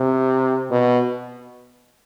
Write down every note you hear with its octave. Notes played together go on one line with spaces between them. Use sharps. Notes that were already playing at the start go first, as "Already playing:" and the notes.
Already playing: C3
B2